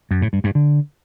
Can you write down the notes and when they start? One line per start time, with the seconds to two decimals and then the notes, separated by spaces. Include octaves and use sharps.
0.11 F#2
0.22 A2
0.33 G2
0.44 G2
0.55 D3